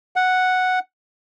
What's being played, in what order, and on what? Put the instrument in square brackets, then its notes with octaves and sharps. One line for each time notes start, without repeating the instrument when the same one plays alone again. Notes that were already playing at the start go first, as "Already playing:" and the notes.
[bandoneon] F#5